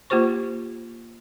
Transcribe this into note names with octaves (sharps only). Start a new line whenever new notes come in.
A#3 F4 G4 C5 C#6